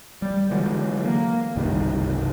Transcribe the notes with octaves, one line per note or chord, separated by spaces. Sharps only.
G3
D3 E3 F#3 G#3
A#3
F#1 C2 G2 D#3